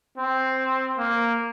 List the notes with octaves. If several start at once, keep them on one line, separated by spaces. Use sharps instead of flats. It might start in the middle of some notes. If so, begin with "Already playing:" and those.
C4
A#3